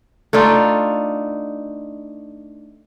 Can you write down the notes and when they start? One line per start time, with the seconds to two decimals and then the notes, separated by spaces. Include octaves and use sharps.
0.33 A3 D4 D#4 F4